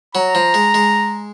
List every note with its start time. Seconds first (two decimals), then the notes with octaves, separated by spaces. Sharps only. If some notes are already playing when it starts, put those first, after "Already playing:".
0.15 F#3 A#5
0.35 F3
0.54 G#3
0.74 G#3